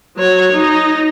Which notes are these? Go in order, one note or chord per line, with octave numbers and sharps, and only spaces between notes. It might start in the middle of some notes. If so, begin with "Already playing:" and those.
F#3 C#5
D#4